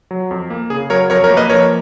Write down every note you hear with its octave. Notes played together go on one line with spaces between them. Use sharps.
F#3
F2
A#3
C#3 G#4
F#3 A#4 C#5
F2 A#4 C#5
A#4 C#5
A#3
B4 D#5
F3 A#4 C#5